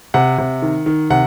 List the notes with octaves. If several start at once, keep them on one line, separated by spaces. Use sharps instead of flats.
C3 F#5
C3
D#3
D#3
C3 F#5